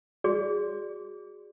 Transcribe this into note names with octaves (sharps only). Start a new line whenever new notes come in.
F#4 G#4 D5